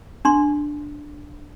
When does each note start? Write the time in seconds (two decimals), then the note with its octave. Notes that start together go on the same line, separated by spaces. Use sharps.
0.25 D4 C6